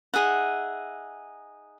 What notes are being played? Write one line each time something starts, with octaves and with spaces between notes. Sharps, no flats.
D#4 G#4 E5 F#5